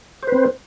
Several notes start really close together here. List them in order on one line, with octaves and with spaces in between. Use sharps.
C5 B4 C4